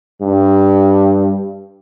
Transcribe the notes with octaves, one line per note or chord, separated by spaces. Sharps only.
G2